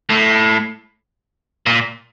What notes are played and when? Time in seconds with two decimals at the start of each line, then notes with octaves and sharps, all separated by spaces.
0.10 A2
1.67 A#2